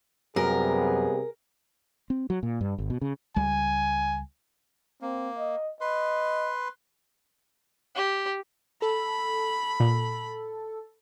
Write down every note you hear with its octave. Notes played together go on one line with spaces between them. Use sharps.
F#2 C3 G3 B3 G#4 A#4
C4
F#3
A#2
G2
G#1
B2
C#3
C#2 G3 G#5
A#3 C4
D#5
B4 D#5 C6
G4
A4 B5
A#2